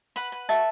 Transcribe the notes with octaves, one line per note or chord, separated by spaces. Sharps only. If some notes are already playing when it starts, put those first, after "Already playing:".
B4 F#5 B5
B4
F#4 E5 A5